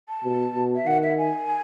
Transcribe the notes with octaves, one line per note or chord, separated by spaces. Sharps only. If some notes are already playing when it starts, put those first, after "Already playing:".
A5
B2
B2
E5
D#3 F#5
E5
G#5